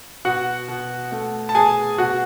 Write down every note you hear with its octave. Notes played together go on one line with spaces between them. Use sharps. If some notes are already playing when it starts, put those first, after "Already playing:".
B2 F#4 F#5
B2
A3
A5
B2 G#4 G#5
B2 F#4 F#5